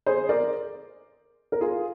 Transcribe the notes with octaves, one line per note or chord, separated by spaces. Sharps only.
G#4 C5
A#4 D5
A#4
F4 G#4